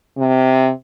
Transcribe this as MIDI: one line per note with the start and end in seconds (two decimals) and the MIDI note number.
0.18 0.70 48